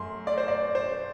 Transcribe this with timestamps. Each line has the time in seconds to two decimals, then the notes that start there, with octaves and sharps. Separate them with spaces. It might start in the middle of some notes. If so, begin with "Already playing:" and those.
Already playing: F#2 F#3 A3 C6
0.27 D5
0.37 C5
0.48 D5
0.75 C5